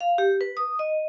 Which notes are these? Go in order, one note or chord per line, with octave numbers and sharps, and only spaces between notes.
F5
G4
B4
D#6
D#5